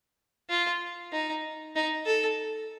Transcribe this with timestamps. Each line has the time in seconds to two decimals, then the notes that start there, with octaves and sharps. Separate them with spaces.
0.50 F4
1.13 D#4
1.76 D#4
2.06 A4